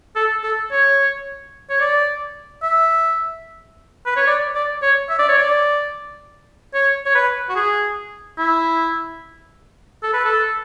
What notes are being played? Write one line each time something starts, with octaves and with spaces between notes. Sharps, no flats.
A4
A4
C#5
C#5
D5
E5
B4
C#5
D5
D5
C#5
E5
D5
C#5
D5
C#5
C#5
B4
F#4
G#4
E4
A4
B4
A4